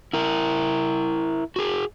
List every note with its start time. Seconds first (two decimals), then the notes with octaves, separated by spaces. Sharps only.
0.13 E4 A#4
1.56 F#4 G#4